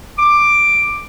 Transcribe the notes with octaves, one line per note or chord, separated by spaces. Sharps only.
D6